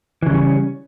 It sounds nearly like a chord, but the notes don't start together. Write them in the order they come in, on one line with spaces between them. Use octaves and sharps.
E3 C#3 G3 C#4